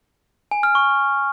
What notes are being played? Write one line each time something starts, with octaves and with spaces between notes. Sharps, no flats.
G#5
F6
C#6